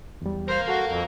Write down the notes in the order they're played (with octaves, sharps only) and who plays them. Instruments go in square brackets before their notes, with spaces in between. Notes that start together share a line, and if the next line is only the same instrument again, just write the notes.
[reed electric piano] E2 G3
[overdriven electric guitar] A#4 F5 [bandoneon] C5
[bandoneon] F#4 [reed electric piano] A4
[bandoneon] F2